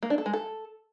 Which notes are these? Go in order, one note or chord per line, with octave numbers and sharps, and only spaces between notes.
A#3
D4
A4
G#3
A4